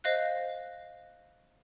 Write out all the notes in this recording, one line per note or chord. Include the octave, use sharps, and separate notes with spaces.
C5 D#5 F5 F#6